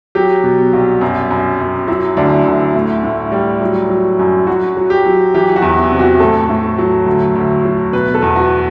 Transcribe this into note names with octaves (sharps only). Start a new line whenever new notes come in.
F#3 G4
B2
C2
F#2
F#2
F#2
F#3 E4
D2 D4
D2 E4
A2
A2
G3
F#3
F#3
F#2
F#3 F#4
F#3
G4
F#3
E3 G4
F#4
E2
E4
C3
F#4
A2 A4
A2
F#3
D2
D2
F#3
B2 B4
A4
E2
F#4